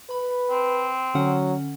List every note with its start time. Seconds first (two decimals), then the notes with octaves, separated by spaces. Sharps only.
0.10 B4 B5
0.50 C4
1.15 D3 F#3 C#4 F#5